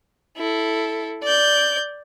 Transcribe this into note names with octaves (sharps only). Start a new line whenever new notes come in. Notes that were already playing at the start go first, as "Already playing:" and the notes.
E4 A4
D5 G6